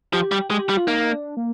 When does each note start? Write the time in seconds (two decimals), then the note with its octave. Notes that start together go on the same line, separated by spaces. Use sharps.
0.13 F3 G4
0.32 G3
0.50 G#3 G4
0.69 G3
0.77 F4
0.87 A#3 D#4
1.12 D4
1.37 A#3